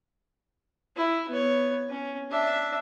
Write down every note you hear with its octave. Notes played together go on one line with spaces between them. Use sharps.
E4
B3 C#5
C#4
D4 E5